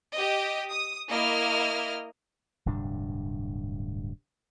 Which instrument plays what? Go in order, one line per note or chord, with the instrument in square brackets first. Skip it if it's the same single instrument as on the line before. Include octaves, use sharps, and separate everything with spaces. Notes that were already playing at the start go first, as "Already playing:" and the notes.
[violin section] G4 D#5
D#6
A#3 E4 D#5 F6
[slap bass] D1 G2 C3 D4